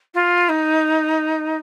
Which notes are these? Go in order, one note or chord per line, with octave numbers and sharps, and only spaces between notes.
F4
D#4